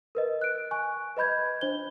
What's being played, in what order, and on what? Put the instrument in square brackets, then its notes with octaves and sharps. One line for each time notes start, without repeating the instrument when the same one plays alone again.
[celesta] A#4 B4 D#5
F#6 D7
G#5 C#6 F#6
B4 D#5 B5 G6 G#6
D4 C5 G7